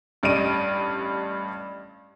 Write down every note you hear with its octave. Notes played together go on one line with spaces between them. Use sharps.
A1 G2 D5 D#5 D7 D#7